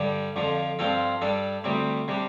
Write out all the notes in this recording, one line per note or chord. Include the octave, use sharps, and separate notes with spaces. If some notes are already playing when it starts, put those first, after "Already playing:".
Already playing: G2 D3 G3
F2 D3 F3
G2 F3 C4 F4 A4
G2 G3 D4 A4
D2 C3 G3 C4
C3 G3 D4